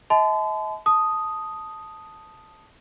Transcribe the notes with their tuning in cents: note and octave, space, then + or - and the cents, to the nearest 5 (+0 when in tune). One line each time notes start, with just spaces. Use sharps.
D#5 +45 A5 -35 C6 -40
A5 +0 D#6 +0